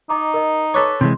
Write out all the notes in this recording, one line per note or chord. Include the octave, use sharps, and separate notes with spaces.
D#4 D#5 A#5 D6
A#4 D#5
A4 B4 C#5 D6
C3 E3 G#3 C6